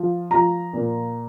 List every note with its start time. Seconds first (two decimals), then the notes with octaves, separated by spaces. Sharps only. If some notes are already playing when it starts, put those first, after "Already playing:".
Already playing: F3
0.30 F3 A#5
0.73 A#2